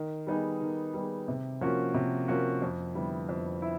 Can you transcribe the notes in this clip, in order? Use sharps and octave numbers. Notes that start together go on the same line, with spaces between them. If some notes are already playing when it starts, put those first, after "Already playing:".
Already playing: D#3
G3 B3 D#4 G#4
D#3
G3 B3 D#4 G#4
C3
F3 A#3 C#4 F#4
C3
F3 A#3 C#4 F#4
F2
D3 G3 B3 E4
F2
E4